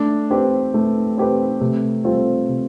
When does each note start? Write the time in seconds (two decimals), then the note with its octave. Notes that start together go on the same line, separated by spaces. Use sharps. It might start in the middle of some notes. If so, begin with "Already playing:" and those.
Already playing: A3 D4
0.30 C4 G4 B4
0.74 A3
1.17 C4 G4 B4
1.61 C3 A3
2.04 G3 C4 F4 A4
2.48 C3